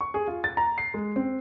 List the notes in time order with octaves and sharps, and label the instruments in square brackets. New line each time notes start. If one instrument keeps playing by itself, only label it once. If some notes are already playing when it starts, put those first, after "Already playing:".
[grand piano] C#6
G#4
F4
A6
A#5
C7
G#3
C4